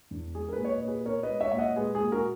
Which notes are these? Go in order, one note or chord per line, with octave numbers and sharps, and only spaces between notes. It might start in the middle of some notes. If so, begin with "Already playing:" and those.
E2
G#3 G#4
A#4
G#4 B4
A#2
C#5
B4 D#5
A#2
G#4 B4
B3 A#4 C#5
B4 D#5
G#3
C#5 E5
A#2 E5
D#5 F#5
G#3 G#4 B4
G#4
A#2
F#4 A#4